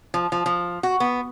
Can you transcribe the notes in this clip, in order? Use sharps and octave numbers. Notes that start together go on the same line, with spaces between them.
F3
F3
F3
F#4
B3